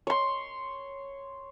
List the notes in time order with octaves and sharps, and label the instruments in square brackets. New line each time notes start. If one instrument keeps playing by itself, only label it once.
[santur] C#5 C6